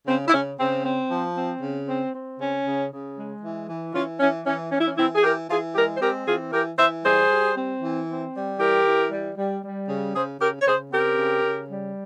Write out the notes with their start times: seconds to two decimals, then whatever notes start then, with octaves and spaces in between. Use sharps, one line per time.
0.06 C#3 C4
0.28 E4
0.32 C#3 C#4
0.58 C#3 C4
0.84 C4
1.10 F3
1.36 C4
1.62 C#3
1.88 C4
2.14 C4
2.39 C#3 C#4
2.65 C#3
2.91 C#3
3.17 G#3
3.42 E3
3.68 E3
3.94 E3 C#4 F4
4.20 E3 C#4
4.46 E3 C#4
4.72 E3 C#4
4.79 E4
4.87 C#4
4.97 E3 C4 E4
5.14 G#4
5.23 E3 G4 A#4
5.49 E3 F4 G#4
5.75 G#3 G4 A#4
5.96 C5
6.01 C4 G4 A#4
6.26 E3 F4 G#4
6.52 E3 G4 A#4
6.78 E3 C5 E5
7.04 G3 G#4 C5
7.30 G3
7.55 C4
7.81 E3
8.08 C4
8.34 G3
8.59 E3 G4 A#4
8.85 E3
9.11 G3
9.36 G3
9.63 G3
9.88 C#3
10.14 C#3 G#4 C5
10.39 C#3 G4 A#4
10.60 C#5
10.65 C#3 G#4 C5
10.91 C4 G4 A#4
11.17 C#3
11.43 C#3
11.69 G3